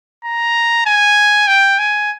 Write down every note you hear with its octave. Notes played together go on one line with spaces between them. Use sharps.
A#5
G#5
G5
G#5